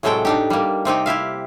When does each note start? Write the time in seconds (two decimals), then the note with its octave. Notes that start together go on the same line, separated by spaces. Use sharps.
0.03 A2 C3 F#3 G#3 A4 G5
0.25 D4 D#4 G4
0.50 G3 A#3
0.85 C3 C4 D#4 G4
1.06 E4 G4 E5 F5